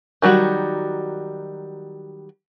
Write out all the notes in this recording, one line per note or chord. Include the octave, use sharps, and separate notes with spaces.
D#3 F#3 G3 F#4